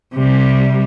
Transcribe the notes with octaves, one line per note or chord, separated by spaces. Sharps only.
C3 G3